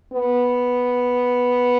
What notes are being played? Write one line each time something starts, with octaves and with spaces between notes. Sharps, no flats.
B3